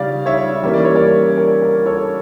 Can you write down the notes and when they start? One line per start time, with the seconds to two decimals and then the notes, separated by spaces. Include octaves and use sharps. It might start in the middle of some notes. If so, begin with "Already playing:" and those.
Already playing: C#3 G3 D5 F5
0.26 C#5 E5
0.63 E3 G3 A#3 C#4 E5
0.74 D5
0.85 C#5
0.95 A#4 D5
1.37 A#4
1.62 A#4
1.86 A4 C#5